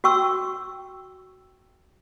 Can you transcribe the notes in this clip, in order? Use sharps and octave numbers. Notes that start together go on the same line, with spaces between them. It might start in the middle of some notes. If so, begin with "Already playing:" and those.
F#4 G5 C#6 E6